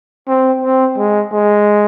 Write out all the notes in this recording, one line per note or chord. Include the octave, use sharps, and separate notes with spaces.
C4
C4
G#3
G#3